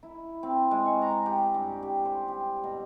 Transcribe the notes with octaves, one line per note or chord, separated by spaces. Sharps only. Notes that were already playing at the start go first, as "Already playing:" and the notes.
E4
C4
G#3
C#6
A#5
G4
G2
G4
C5
G4
B2